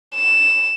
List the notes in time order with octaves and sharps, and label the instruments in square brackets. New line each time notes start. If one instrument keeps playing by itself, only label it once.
[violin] E7